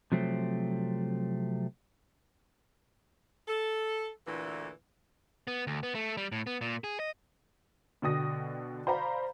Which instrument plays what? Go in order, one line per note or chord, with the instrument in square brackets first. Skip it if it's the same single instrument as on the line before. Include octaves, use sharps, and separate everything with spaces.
[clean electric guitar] C3 F3 F#3 A3 C4
[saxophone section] A4
D2 A#2 D3 E3
[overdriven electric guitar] B3
D2
B3
A3
G3
A2
B3
A#2
G#4
D#5
[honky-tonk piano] B2 D3 G5 D#6 A#6
C5 D5 F5 A#5 B5